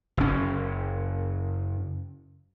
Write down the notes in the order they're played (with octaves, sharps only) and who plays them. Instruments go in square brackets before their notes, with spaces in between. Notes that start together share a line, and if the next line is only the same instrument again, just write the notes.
[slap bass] F#1 C#4